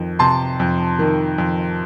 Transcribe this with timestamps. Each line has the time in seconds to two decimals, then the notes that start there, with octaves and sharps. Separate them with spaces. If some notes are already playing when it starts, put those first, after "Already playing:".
Already playing: F2 D#3
0.19 C3 A5 C6
0.59 F2
0.99 D#3
1.38 F2